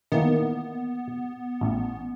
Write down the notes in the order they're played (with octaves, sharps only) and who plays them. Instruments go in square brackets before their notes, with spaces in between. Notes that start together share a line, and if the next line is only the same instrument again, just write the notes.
[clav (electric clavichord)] D#3 E3 A#3 [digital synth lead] B3
[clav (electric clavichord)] A1